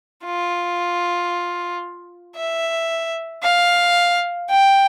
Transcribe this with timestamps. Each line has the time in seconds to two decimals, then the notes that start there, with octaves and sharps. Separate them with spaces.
0.24 F4
2.37 E5
3.43 F5
4.50 G5